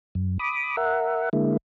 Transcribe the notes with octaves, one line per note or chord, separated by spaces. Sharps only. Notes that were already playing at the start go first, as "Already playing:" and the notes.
F#2
B5 D6 D#6
A#4 E5 F#5
D3 G#3 A#3 E4